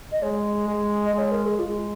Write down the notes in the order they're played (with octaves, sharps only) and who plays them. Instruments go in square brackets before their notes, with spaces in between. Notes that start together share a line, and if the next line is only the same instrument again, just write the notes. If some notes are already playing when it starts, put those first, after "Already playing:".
[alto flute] D#5
[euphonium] G#3 [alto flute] C#5
[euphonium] G#3
[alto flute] D#5
[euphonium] G#3 [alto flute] C#5
[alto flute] A#4
G#4
[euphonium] G#3 [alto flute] F4